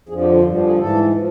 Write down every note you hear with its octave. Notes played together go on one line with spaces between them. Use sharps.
F2 D3 F3 G#4
G4
F4
G2 D3 F3
G4
G#4
G#2 E3 A4
F3